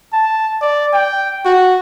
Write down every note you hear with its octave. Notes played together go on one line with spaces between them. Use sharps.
A5
D5
G5
F#4